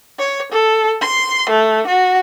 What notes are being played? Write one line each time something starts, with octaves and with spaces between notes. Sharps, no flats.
C#5
A4
C6
A3
F#4